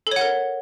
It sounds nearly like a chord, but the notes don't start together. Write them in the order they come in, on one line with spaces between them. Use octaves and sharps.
A4 C#5 F#5 A#4